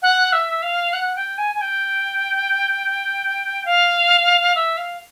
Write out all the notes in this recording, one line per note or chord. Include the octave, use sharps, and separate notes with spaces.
F#5
E5
F5
F#5
G5
G#5
G#5
G5
F5
E5
F5